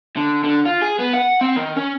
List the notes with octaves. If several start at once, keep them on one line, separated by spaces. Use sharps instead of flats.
D3
D3
F4
G#4
B3
F#5
C4
D#3
C#4